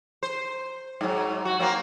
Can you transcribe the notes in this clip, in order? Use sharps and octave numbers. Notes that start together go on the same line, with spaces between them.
C5
G#2 F#3
F#4
F#3 A#3 C4